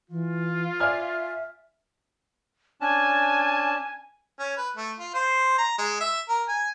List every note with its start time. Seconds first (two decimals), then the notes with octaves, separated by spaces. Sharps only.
0.10 E3 F4
0.80 D5 E5 G#5 F6
2.81 C#4 D4 G#5 A5
4.39 C#4
4.58 B4
4.77 A3
4.98 F4
5.14 C5
5.58 A#5
5.78 G#3
6.01 E5
6.29 A#4
6.48 G#5